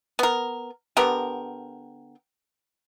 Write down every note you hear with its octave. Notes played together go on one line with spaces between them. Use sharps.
B3 A#4
D3 B3 G4 A#4